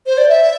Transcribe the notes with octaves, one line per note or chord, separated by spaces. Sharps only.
C5
D5
E5